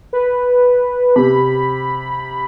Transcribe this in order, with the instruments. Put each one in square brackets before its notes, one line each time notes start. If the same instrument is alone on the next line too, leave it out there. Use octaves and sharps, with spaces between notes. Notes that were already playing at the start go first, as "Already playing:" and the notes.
[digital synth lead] B4
[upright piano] C3 [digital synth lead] B5